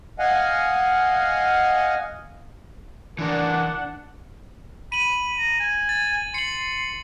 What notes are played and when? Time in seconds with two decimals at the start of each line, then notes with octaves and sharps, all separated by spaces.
0.19 D#5 F5 F#5 G#5
3.19 E3 D4 A#4 F#5
4.92 B5 D#7 F#7
5.39 A#5
5.60 G#5
5.89 A6
6.34 C6 C#7 F#7